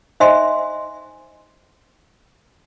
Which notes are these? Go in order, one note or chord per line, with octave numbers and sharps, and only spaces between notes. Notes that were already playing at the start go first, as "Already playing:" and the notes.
D#4 C5 D#5 E5 G#5 C6